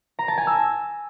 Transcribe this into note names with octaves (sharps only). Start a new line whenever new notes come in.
A#5
A5
G#5
E6